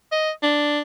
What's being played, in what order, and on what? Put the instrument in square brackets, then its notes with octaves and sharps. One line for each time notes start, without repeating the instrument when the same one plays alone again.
[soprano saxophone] D#5
D4